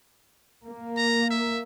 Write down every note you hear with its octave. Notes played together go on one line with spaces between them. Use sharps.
A#3
A#5
E5